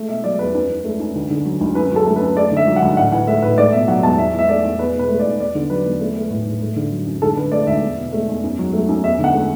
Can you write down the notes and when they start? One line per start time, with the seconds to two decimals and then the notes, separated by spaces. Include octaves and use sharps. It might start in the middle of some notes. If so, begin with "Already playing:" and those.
Already playing: A3
0.09 B2 E5
0.24 F#3 D5
0.39 E2 B4
0.54 F#2 B4
0.70 E3
0.84 A3
1.00 F#2
1.16 D2
1.30 D3
1.45 F#3
1.61 D2
1.75 F#2 B4
1.91 F#3 A4
2.06 A3
2.16 B4
2.21 F#2
2.36 A3 D5
2.52 D3 E5
2.67 F#3
2.76 F#5
2.83 D2
2.97 A2 F#5
3.12 E3 F#5
3.27 A3 E5
3.42 A2 B4
3.58 A3 D5
3.72 B2 E5
3.88 F#3 F#5
4.03 E2 A5
4.18 E2 E5
4.34 E3 E5
4.49 A3 D5
4.64 E2
4.79 E2 B4
4.94 B2 B4
5.09 A3
5.20 D5
5.25 E2
5.40 E2 D5
5.55 D3
5.70 F#3 B4
5.86 E2
6.00 A3
6.16 A3
6.31 A2
6.45 A2
6.62 A3
6.76 D3
6.91 F#3
7.07 F#2
7.22 D2 A4
7.37 D3 B4
7.52 A3 D5
7.67 D2 E5
7.83 E2
7.98 B2
8.13 A3
8.29 E2
8.43 F#2
8.59 F#3
8.73 A3
8.88 F#2
9.04 E2 E5
9.19 D3
9.24 F#5
9.34 A3